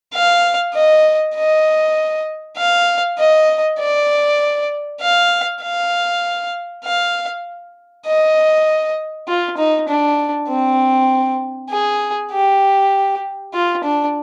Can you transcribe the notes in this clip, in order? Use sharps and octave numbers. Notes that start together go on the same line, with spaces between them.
F5
D#5
D#5
F5
D#5
D5
F5
F5
F5
D#5
F4
D#4
D4
C4
G#4
G4
F4
D4